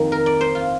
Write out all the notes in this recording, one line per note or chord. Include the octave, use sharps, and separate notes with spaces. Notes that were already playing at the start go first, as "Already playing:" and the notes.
Already playing: F2 D#3 A#3
A#4
D5
C5
F4